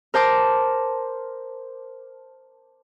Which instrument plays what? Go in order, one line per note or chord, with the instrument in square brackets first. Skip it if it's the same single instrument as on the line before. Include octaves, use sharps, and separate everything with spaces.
[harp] A#4 C5 A5 D6